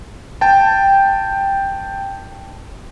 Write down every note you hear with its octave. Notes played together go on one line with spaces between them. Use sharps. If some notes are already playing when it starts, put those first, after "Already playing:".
G5 A5